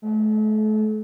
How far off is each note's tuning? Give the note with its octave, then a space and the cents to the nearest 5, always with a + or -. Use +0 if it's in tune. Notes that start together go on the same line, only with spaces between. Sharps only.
A3 -40